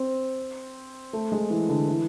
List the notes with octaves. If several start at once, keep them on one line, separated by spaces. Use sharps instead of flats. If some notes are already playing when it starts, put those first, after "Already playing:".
Already playing: C4
A3
G#3
E3
D3
E3